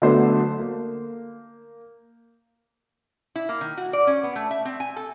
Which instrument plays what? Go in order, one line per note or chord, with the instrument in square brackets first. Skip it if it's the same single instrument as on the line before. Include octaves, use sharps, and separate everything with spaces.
[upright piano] D3 F#3 A3 B3 D4 C5
A#3
[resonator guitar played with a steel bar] E4
A#3
D#3
F#4
D5
C#4
B3
A3
E5
C4
G#5
A4